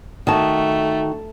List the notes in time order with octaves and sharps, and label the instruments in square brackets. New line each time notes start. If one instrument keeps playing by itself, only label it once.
[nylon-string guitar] D#3 F#4 A5 [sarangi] A3